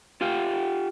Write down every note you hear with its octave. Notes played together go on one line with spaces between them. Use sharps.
F4 G4 F5 G5